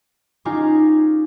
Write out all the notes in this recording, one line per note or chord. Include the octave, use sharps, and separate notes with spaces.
C#4 D#4 F4 G4 G#4